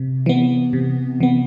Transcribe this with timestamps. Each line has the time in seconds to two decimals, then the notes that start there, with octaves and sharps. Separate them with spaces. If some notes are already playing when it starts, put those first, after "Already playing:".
Already playing: C3
0.26 E3 B3
0.73 C3
1.20 E3 B3